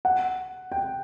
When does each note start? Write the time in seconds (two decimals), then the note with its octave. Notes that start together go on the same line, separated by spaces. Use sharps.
0.05 F#5
0.72 G5